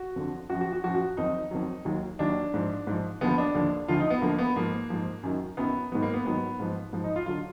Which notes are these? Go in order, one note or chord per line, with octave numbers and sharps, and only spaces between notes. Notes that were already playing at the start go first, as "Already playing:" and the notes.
Already playing: F#4
F2 D3 F3
F#2 F3 F#4
F#4
F#4
F#2 F3 F#4
F#4
F2 D#3 F#3 D#4
F2 D#3 F#3
D#2 D#3 F#3
D#2 D#3 F#3 D4
G#2 F3
G#2 F3
D#2 D3 F3 B3
D4
D#2 D3 F3
D2 D3 F3 F4
D#4
B3
D2 D3 F3 A#3
B3
G#2 F3 A#3
G#2 F3
F#2 D#3 F#3
F#2 D#3 F#3 B3
G#2 D#3 F#3 B3
A#3
B3
G#2 D#3 F#3 B3
G#2 F3
G#2 F3
D#4
F4
D3 F#3 F4